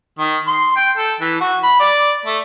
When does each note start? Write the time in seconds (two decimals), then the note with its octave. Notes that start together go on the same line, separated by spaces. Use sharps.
0.19 D#3
0.48 C6
0.76 G5
0.97 A4
1.20 E3
1.41 F#4
1.63 B5
1.80 D5
2.26 A3